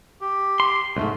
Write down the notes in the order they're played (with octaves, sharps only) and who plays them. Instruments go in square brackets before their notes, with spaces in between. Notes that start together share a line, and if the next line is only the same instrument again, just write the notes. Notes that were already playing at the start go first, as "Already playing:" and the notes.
[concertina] G4
[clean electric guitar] C6
[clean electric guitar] C2 G#2 [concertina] A3